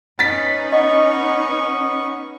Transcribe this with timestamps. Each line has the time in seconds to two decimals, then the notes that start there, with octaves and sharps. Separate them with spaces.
0.19 C#4 D#4 B4 A6 B6
0.72 B3 D#5 C#6